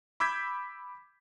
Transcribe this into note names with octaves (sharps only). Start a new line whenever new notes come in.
B5 D6 E6 G6 G#6 B6